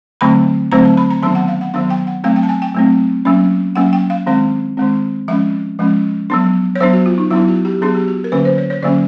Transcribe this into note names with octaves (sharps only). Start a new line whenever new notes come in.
D3 F#3 A3 C4 B5
D3 F#3 A3 C4 A#5
A5
B5
A#5
D#3 F#3 B3 D4 A5
F#5
F5
F#5
D#3 F#3 B3 D4 F5
G5
F#5
F#3 A3 C4 F5
G5
A5
G#5
G5
F#3 A3 C4
F#3 A#3 C#4
F#3 A#3 C#4 F#5
G5
F5
D#3 G#3 C4 F5
D#3 G#3 C4
F3 G#3 C#4 E5
F3 G#3 C#4
F#3 B3 D4
C#5
F#3 B3 D4 C5
F#4
F4
D#4
F#3 B3 D4 E4
F#4
G4
F#3 B3 D4 G#4
G4
F#4
A#4
D3 F#3 A#3 C#4 B4
C5
C#5
C#5
D3 F#3 A#3 C#4 D5